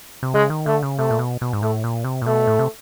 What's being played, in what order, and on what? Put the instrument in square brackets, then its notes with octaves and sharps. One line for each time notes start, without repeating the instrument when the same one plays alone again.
[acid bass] C3
[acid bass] C#3 [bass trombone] G#3
[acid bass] D#3
[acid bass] D3 [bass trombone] A3
[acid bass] C#3
[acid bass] C3 [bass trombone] A3
[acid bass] A#2
B2
B2
G#2
[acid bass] A2 [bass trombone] A3
[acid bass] A#2
C3
A#2
[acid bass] B2 [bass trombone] A3
[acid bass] A2
C3